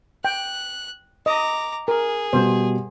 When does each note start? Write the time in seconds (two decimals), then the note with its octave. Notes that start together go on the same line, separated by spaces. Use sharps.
0.25 G5 F#6
1.26 D#5 A#5 D6
1.88 G#4 A#4
2.33 B2 G3 C5